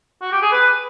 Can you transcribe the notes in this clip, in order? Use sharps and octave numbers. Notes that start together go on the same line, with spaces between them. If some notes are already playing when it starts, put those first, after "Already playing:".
F#4
G4
G#4
B4